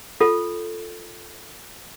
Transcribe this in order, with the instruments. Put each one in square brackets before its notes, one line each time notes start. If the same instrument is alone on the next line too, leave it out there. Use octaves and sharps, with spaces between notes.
[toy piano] F4 A4